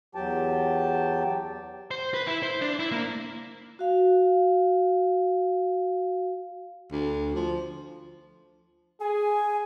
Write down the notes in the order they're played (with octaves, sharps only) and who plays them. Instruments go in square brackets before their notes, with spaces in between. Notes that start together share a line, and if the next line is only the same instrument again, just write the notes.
[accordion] E2 F#3 G4 G5 A5
[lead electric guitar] C5
B4
E4
C5
D4
E4
A#3
[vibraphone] F#4 F5
[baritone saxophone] D2
F3
[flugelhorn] G#4 [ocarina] G#5